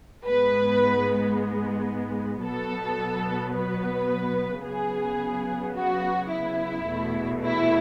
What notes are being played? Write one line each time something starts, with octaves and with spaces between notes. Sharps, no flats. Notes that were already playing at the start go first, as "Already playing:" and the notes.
G#2 G#3 B3 B4
B2 F#3 B3 A4
B4
C#3 F#3 B3 G#4
F#4
E4
E2 B2 A3
E4